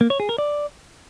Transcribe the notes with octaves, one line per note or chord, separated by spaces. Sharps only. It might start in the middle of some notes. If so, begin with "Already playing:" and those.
A#3
C#5
G#4
A#4
D5